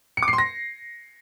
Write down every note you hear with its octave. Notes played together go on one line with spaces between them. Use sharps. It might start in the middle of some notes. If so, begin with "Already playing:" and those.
C#7
D6
C7
C6
A#6